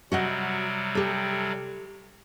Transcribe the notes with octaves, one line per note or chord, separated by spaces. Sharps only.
C3 F#3 G3 F#4 D#5 F#5
G4 A4